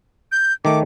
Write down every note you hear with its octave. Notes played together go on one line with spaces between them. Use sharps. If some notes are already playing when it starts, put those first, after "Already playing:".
G6
D#3 A3 D6